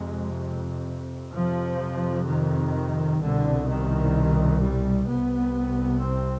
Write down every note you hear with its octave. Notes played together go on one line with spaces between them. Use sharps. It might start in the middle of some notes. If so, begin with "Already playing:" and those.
Already playing: F2 C3 G#3
F2 C3 F3
D#3
C2 B2 D3
D#3
G3
C2 C3 B3
C4